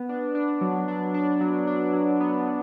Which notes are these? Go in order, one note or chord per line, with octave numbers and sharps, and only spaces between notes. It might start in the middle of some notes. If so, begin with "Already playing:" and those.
Already playing: B3
D4
D4
F#3
D4
D4
F#3
D4
F#3
B3
F#3